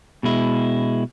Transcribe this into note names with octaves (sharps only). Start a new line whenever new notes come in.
B2 G#3 E4